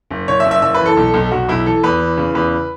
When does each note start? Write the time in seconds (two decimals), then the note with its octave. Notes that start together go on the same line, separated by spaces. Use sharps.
0.11 F#1
0.28 F#1 C#5
0.40 E5
0.45 F#1
0.51 E5
0.62 F#1 E5
0.74 B4
0.80 E3
0.86 A4
0.97 B1
1.14 B1
1.31 B1 F#4
1.49 B1 E4
1.66 E3 A4
1.84 E2 B4
2.00 E3
2.17 C#3
2.35 E2 B4